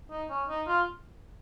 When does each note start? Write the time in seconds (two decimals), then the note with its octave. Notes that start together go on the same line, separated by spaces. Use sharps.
0.10 D#4
0.30 C#4
0.49 D#4
0.67 F4